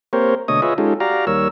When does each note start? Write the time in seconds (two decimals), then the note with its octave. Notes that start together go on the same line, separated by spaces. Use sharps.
0.13 A#3 C4 G4 A#4 C5 C#5
0.48 B2 D3 A3 C#5 D#5 D#6
0.62 F4 G#4 B4 C#5 D#5 E5
0.78 G#3 C#4 D#4 F4 G4 A4
1.00 F#4 G4 D5 F5 A#5
1.27 D#2 G3 A#4 C#5 E6